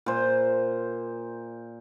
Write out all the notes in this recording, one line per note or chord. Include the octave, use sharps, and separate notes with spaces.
A#2 C5